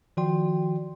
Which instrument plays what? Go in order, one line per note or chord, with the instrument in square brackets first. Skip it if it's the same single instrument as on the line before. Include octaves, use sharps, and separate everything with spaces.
[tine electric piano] D#3 F3 F#4 D5 G5 C6